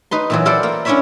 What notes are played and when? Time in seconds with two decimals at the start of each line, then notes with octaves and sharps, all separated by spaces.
0.11 D#4 B4 C6
0.30 A#2 E3 F#3
0.45 E4 F4 A4 C5 D5 F#5
0.63 A#3
0.85 C#4 D4 E4 C#5 E5 B5